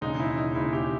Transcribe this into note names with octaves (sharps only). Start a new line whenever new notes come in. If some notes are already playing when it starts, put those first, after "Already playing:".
E1 D#2 C#3 G#3 D#4
E4
D#4
E1 D#2 C#3 G#3 E4
G4